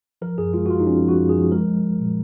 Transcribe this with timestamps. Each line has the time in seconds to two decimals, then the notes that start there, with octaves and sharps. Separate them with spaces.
0.22 F3 A#4
0.38 F#2 G#4
0.54 G#3 F4
0.66 F#4
0.70 G#3 F4
0.80 D#4
0.86 F3 C#4
1.03 F3
1.09 F#4
1.20 F#2
1.29 G#4
1.36 F3
1.51 G#3 A#4
1.68 G#3
1.84 G#3
2.00 A#2